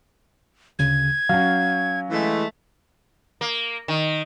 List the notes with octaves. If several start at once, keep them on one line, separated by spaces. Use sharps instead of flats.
D2 C#3 G#6
F#3 C#4 F5
E3 G#3 A3
A#3
D#3